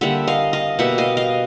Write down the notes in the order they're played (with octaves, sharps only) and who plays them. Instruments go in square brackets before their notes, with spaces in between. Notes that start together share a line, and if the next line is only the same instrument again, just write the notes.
[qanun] D3 G3 A#3 E5 F#5
D#5 F5
D#5 F5
B2 G3 A#3 E5 F#5
D#5 F5
D#5 F5